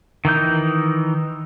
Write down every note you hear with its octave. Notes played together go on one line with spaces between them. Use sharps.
D#3 E3 D#4 G6